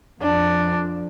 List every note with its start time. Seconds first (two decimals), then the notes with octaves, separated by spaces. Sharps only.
0.21 F2 F3 D4